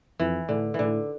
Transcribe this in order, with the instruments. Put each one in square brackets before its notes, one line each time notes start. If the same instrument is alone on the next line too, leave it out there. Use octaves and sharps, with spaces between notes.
[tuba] F2 [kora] E3
[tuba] A2 [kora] D3
[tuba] A2 [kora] D3 E3